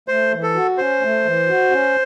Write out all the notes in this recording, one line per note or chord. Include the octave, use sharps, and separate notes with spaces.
A3 C5
E3
A4
F#4
C#4 C5
A3
E3
F#4
C#4